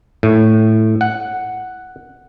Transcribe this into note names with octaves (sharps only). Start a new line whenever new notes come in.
A2
F#5